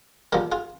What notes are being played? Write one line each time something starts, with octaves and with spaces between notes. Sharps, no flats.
A#2 F3 G#3 G4 A#4
F4 G#4